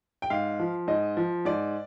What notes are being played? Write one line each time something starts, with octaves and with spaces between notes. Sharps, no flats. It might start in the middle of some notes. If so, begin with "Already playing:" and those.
G5
G#2 F5
F3
G#2 D#5
F3
G#2 D5